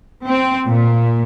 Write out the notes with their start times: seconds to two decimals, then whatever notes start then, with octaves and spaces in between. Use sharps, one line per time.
0.25 C4
0.67 A#2